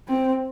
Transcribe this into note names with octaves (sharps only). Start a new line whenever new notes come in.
C4